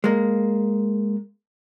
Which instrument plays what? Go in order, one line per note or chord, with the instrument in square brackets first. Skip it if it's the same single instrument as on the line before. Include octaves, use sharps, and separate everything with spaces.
[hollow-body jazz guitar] G#3 A#3